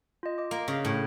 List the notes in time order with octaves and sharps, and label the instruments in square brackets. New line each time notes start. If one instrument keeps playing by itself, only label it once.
[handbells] F4 D#5
D#5 D6
[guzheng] A#3
C#3
A2